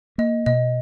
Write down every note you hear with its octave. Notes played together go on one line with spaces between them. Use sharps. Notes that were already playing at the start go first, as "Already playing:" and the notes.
A#3 D#5
B2 D#5